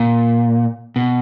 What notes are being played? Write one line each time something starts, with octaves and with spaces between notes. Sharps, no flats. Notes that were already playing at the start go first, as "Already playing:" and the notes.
Already playing: A#2
B2